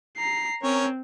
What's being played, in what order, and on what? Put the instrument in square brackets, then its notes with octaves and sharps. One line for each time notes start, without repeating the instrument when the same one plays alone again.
[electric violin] A#5 C7
[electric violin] C4 [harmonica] C#4 A#4 C#5